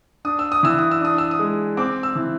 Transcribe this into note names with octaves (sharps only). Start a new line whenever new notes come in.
D4 D#6
E6
D#6
E3 E6
D#6
E6
D4 D#6
E6
D#6
G#3
C4 D6
E6
E3